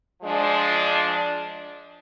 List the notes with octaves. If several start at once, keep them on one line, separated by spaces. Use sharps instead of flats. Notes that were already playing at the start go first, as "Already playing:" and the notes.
F3 G#3 D4